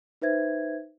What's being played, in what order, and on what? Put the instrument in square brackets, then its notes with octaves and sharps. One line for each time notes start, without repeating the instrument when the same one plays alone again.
[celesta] D#4 B4 C5 E5 G#6